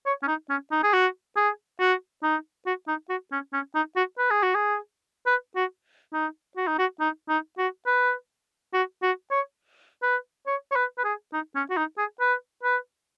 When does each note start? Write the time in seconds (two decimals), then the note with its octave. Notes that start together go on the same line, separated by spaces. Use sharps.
0.06 C#5
0.23 C#4
0.28 D#4
0.50 C#4
0.72 D#4
0.83 G#4
0.93 F#4
1.36 G#4
1.80 F#4
2.23 D#4
2.66 F#4
2.88 D#4
3.09 F#4
3.32 C#4
3.53 C#4
3.75 D#4
3.96 F#4
4.18 B4
4.31 G#4
4.43 F#4
4.55 G#4
5.27 B4
5.56 F#4
6.13 D#4
6.57 F#4
6.67 D#4
6.79 F#4
7.00 D#4
7.29 D#4
7.58 F#4
7.86 B4
8.73 F#4
9.02 F#4
9.31 C#5
10.03 B4
10.47 C#5
10.72 C#5
10.76 B4
10.98 B4
11.04 G#4
11.33 D#4
11.56 C#4
11.70 F#4
11.77 D#4
11.98 G#4
12.20 B4
12.63 B4